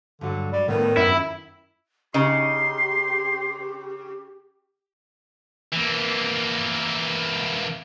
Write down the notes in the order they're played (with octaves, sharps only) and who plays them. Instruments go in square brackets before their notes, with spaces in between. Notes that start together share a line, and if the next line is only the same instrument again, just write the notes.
[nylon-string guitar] G2 F#3 [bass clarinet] D3
[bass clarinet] G3
[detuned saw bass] A2 [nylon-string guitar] D3 B3 [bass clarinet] D#3
[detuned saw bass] F#2 [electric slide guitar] E4
[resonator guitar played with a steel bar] C#3 [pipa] D#4 [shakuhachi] G4 [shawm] C6
[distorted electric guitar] E3 A#3